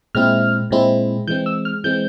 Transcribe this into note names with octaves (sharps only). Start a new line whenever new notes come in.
A#2 G#3 C4 E4 F6
A#2 G#3 C4 E4
E3 G#3 C4 G6
E6
F6
E3 G#3 C4 G6